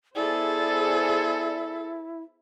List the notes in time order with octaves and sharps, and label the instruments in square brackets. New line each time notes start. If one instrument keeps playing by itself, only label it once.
[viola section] B3 G#4 C5 [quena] E4 [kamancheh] A4 [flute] D5